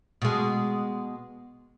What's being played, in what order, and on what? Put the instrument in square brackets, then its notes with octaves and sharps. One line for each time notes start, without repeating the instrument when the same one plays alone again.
[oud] B2 G#3